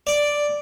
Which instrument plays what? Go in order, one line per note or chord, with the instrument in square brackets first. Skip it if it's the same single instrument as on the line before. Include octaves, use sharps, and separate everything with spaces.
[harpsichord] D5